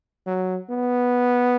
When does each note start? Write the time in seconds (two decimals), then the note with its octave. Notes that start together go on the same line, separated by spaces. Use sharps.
0.26 F#3
0.70 B3